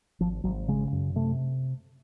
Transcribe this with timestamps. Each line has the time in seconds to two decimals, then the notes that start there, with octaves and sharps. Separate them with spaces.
0.21 G#1 F3
0.44 G#1 F#3
0.68 C#3 G#3
0.92 F#2
1.16 C3 A3